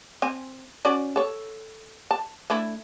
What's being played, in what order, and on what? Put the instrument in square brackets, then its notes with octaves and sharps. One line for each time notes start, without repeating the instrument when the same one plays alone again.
[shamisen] C4 G#5
C#4 F#4 D5
A4 C#5
A5
A3 D4 E4